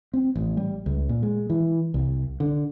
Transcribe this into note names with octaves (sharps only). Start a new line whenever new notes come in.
C4
A1
G3
C#2
A#2
G#3
E3
C2
D3